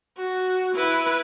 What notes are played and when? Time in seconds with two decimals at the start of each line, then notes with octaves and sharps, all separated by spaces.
0.17 F#4
0.75 E4 B4